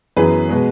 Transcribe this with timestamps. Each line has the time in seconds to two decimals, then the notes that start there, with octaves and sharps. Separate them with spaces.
0.16 F#2 E3 B3 G#4 B4
0.49 B2 G#3 B3